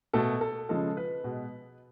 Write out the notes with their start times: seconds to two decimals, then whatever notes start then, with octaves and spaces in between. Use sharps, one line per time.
0.13 B2 A3 A4
0.41 A4
0.69 C#3 F3 G#3 A4
0.97 B4
1.24 B2 G#3